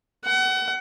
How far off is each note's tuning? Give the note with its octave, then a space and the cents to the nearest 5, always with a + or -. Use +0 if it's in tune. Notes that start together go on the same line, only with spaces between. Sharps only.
F#5 +30